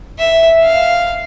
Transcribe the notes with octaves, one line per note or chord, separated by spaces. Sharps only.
E5
F5